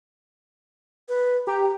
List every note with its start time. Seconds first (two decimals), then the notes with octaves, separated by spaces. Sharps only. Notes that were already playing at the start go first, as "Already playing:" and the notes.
1.09 B4
1.47 G4 A#5